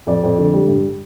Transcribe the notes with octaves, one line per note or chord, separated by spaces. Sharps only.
F2 D5
F2
D3
G3
G2